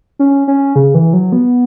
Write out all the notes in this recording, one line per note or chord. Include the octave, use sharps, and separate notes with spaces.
C#4
C#4
C#3
E3
F#3
B3